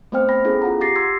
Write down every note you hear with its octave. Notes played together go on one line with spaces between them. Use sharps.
A3 B3 C4 C5 G5 F6
G5 B5 A#6
B3 C#4 E4 G#4 A4
F4 F#5 A#5
G4 D6 A6 A#6 C7
C6 E6 G#6